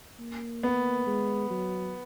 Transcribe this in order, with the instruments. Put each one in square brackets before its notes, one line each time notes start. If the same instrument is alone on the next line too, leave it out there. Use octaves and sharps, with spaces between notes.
[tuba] A#3
[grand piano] B3
[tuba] G#3
F#3